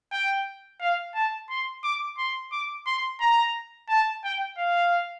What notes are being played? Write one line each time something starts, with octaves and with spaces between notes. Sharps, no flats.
G5
F5
A5
C6
D6
C6
D6
C6
A#5
A5
G5
F5